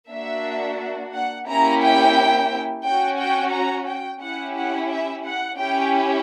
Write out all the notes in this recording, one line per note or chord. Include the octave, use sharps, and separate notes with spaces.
A#3 D4 F#4 E5
F#5
A#3 C#4 E4 G4 A#5
G5
C#4 F#4 G5
G5
A#5
G5
C#4 E4 G4 F#5
F#5
E5
F#5
C#4 E4 G4 G5